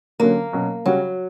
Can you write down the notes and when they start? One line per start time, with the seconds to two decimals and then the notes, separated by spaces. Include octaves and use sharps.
0.20 D3 F#3 A#3 C#4
0.53 B2 F#3 C#4
0.86 C#3 F#3 G3 C#4 F#4